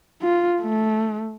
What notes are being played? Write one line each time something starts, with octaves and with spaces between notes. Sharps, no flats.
F4
A3